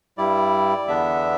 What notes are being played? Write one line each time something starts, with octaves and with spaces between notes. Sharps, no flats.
G2 G3 E4 D5
E2 D3 B3 D4 E5